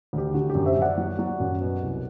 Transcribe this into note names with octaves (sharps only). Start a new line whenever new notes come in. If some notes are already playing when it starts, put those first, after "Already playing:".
D2 G4
D3 F#4
G4
F#2
C5 E5
F#2
D5 F#5
F#3
F#3
F#2
B2
C2